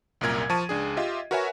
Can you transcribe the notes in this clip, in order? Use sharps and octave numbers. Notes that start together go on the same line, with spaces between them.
C2 F#2 A#2 A#4 G#6
F3 A5 C#6 D#7
C#2 D4 G#4
F4 G4 D#5 E5
F#4 A#4 B4 C#5 E5 G#5